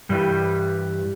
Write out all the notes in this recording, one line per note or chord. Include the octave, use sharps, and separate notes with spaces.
G2 E3 G3